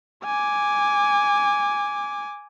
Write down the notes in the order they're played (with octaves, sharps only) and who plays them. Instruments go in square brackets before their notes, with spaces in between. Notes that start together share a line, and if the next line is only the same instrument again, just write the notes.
[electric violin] G#5 D6